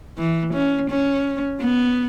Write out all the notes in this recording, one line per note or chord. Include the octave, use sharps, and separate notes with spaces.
E3
C#4
C#4
B3